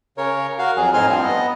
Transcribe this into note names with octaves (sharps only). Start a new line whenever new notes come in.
C#3 A#4 C#5
F#4 A#4 F5
F2 F#3 G#4
A2 C4 D#4 G#5 C6 F6
G2 F3 C4
B3 D#5